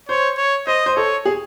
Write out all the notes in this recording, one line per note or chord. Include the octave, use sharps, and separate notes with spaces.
C5 C#5
C#5
C5 D#5
C5
A4 C#5
G#4